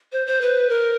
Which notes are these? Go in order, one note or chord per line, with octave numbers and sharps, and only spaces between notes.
C5
C5
B4
A#4